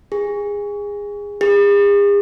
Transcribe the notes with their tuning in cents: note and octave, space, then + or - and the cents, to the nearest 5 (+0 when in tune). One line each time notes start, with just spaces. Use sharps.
G#4 -20
G#4 -45